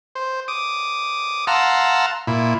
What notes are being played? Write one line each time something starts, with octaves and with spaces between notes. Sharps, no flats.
C5
D6 D#6
F5 F#5 A5 A#5 C6 E6
A#2 E4